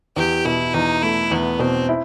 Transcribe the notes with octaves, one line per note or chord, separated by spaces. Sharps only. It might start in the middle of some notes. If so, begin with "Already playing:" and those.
E2 G4
B2 E4
E2 D#4
A3 E4
E2 B3
B2 C4
E4